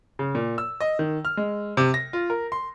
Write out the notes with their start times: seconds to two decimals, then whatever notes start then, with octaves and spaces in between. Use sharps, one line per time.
0.19 C#3
0.35 A#2
0.58 E6
0.80 D#5
0.99 D#3
1.25 F6
1.37 G#3
1.77 C3
1.94 A#6
2.13 F4
2.30 A#4
2.52 C6